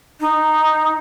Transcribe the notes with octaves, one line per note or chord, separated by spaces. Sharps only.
D#4